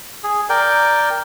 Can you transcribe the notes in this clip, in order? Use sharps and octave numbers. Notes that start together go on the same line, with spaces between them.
G#4
A#4 D5 G5